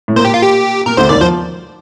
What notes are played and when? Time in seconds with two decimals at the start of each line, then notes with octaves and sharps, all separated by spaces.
0.08 A2
0.16 A#2 C5
0.25 G4
0.34 F4
0.42 G4
0.86 A#2 A#4
0.97 D2 D3 C5
1.09 D#2 D#3 D5
1.21 F3 C5